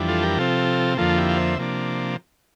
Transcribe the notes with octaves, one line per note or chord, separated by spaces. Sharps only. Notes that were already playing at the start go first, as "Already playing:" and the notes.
Already playing: F2 E3 G3 D4
F4 A4
G4 A#4
C3 F3 C4 F4 A4
F2 D3 F3 A#3 F4 A4
E4 G4
F5
C5 E5
C3 F3 A#3 D4